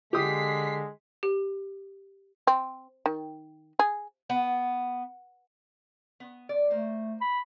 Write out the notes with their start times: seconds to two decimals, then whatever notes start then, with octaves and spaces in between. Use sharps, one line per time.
0.13 D3 G#3 G4 D#6 B6 C7
1.23 G4
2.47 C4
3.06 D#3
3.79 G#4
4.30 B3
6.20 B3
6.49 D5
6.70 A3 A#3 C5
7.21 B5